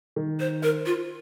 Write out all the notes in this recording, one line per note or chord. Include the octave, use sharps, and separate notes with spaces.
D#3
C5
A#4 C5
F4